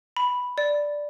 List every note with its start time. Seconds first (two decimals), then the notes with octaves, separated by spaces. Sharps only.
0.17 B5
0.58 D5